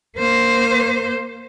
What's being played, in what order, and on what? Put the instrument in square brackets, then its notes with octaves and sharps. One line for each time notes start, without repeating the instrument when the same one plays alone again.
[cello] A#3 C5